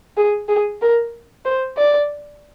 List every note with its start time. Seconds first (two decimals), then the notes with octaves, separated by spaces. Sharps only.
0.17 G#4
0.49 G#4
0.82 A#4
1.45 C5
1.77 D5